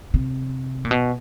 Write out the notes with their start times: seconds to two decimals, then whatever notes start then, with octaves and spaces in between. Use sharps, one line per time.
0.14 C3
0.85 A#2
0.91 B2